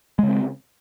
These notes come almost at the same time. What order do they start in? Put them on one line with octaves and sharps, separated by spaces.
G#3 C#3 C4